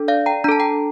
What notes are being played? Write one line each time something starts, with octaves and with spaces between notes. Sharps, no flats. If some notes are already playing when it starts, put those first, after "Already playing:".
Already playing: D4 A4
D5 F5
G5 A#5
D4 A4 A5 A#5
G5 A#5